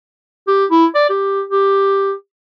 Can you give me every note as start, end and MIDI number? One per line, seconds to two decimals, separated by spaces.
0.47 0.65 67
0.71 0.86 64
0.95 1.08 74
1.10 1.43 67
1.49 2.13 67